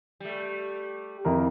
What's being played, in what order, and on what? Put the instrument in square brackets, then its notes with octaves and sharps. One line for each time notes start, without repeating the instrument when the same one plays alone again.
[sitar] G3 A3
[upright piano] F2 E4 A#4